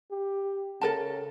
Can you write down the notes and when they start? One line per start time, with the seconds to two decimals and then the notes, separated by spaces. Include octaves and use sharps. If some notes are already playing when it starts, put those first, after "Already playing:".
0.11 G4
0.81 C#3 A4 A#4 A5